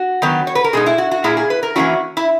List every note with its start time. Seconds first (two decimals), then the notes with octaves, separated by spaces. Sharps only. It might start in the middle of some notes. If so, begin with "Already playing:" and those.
Already playing: F#4
0.22 D#3 F#3 B3
0.47 C#5
0.55 B4
0.64 A#4
0.73 B2 G#3 D#4 G#4
0.86 E4
0.98 F#4
1.11 F#4
1.24 A#2 A#3 E4 G#4
1.37 G#4
1.50 B4
1.63 A#4
1.76 E3 A#3 C#4 E4 F#4
2.17 E4